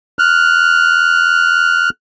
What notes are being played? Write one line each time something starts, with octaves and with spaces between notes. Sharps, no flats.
F6 F#6